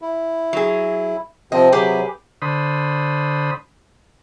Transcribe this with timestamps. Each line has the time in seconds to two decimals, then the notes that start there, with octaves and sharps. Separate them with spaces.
0.02 E4
0.53 F#3 G#4
1.52 C3 F3 C4 D#5
1.72 C3 F#3 G4 G#4 B4
2.42 D3 C5 B5 D#6